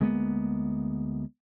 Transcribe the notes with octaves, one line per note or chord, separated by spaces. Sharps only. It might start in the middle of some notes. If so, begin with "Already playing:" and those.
D2 G#3 A#3 B3